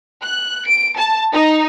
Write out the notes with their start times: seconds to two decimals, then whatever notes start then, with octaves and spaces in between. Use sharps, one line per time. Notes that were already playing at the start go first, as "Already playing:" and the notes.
0.22 F#6
0.66 D7
0.96 A5
1.34 D#4